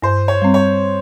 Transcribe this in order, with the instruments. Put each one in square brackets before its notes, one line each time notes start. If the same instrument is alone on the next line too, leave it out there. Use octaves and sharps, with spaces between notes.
[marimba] G2 [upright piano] C5
[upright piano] C#5
[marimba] G3 C4
[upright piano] C#5